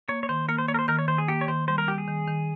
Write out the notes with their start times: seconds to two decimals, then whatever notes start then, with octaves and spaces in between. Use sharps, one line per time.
0.09 A#3 C#5
0.23 C#5
0.29 D#3 C5
0.49 A#3 A#4
0.58 C5
0.68 A#3 C#5
0.74 A#4
0.79 C5
0.88 D#3 A#4
0.99 C#5
1.08 D#3 C5
1.18 G#4
1.28 A#3 G4
1.41 C#5
1.48 D#3 C5
1.68 G3 C5
1.78 A#4
1.88 G3 G4
1.98 G#4
2.08 D#3
2.27 D#3